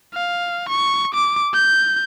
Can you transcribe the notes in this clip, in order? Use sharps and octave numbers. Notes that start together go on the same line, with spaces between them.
F5
C#6
D6
G6